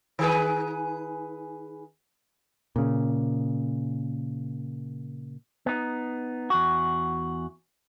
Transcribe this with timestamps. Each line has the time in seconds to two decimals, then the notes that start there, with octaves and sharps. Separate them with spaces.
0.19 D#3 G#4 B4
2.76 A#2 C#3
5.66 B3 D#4
6.50 E2 F#4